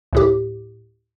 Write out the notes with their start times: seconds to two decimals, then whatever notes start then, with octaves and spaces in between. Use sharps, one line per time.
0.13 D2 A2 G4